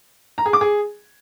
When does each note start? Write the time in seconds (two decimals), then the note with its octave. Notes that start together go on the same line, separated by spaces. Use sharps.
0.38 A#5
0.46 G#4
0.53 D6
0.61 G#4